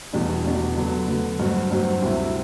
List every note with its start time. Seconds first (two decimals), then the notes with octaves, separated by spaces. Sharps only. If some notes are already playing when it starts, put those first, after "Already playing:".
0.13 E2 B2 G3 D4 F#4
0.44 E2 B2 G3 D4 F#4
0.77 D3 F#3 B3
1.08 D3 F#3 B3
1.40 G2 F#3 C4 F#4
1.71 G2 F#3 C4 F#4
2.02 D2 C3 G3 C4 E4